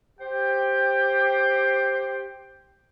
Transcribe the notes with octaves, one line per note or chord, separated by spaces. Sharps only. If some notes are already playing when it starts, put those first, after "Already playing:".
G4 C5 G5